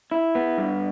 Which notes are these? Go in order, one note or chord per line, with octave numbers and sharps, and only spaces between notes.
E4
B3
G2